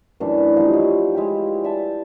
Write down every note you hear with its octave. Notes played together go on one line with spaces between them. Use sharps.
F#2 A2 E3 D4
B4
F3 G3 D#4
F4 C#5 D#5
G#3 E4 F4 G4
D5 E5 A5